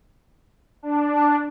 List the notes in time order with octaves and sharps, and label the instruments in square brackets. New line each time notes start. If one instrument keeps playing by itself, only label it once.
[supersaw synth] D4
[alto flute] A5